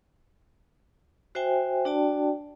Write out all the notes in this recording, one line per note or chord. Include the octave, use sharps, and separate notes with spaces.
F#4 C5 E5 G5 G#5
D4 F#4 D5 G5 A5